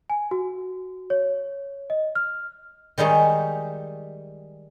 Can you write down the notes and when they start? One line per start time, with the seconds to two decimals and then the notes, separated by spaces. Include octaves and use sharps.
0.10 G#5
0.31 F#4
1.10 C#5
1.90 D#5
2.15 F6
2.98 D#3 G3 G#3 D#4 C#5